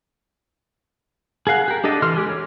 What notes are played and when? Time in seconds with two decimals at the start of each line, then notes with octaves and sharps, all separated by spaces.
1.47 G#4 A#4 F5 F#5
1.68 G4 A#4
1.84 D4 G4 A4 D#5
2.02 E3 A4 C6 F6
2.16 G#3 G4
2.28 G4 C#5